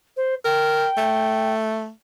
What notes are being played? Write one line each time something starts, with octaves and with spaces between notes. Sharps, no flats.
C5
A#4 G5
A3